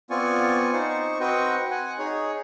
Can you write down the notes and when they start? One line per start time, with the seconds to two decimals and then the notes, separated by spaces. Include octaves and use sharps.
0.10 B3 C4 F4 D5 G#5 C#6
0.73 D#4 C5 C#6
1.20 C4 F#4 B4 D#5 G5 C#6
1.71 F#5 G#5
1.99 D#4 G#4 C#5